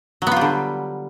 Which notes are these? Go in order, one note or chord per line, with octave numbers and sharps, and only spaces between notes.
D3 F#3 G3 B3 F4